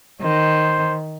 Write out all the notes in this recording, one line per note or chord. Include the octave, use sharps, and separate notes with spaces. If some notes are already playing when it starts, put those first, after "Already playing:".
D#3 C5